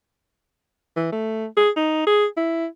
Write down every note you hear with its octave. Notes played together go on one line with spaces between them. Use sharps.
E3
A3
G#4
D#4
G#4
E4